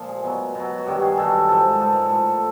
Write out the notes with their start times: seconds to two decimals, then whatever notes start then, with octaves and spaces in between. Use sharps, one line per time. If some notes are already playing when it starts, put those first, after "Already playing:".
Already playing: A#2 F3
0.09 G#4
0.24 B2 F#3
0.55 B2 F#3
0.78 F#4
0.86 G2 D#3 F#3 G4
1.02 G#4
1.18 G2 D#3 F#3 A4
1.49 G#2 F3 A4
1.80 G#2 F3 A4
1.93 A#4
2.05 A4
2.11 A2 F3